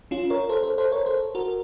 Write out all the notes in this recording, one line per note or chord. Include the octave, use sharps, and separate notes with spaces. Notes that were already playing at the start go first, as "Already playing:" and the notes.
C#4 F4
A#4 C#5
A4 C5
A4 C5
A4 C5
A#4 C#5
A4 C5
F#4 A#4